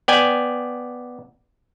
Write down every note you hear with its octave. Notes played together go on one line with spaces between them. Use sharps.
B3 D5 G5 G#5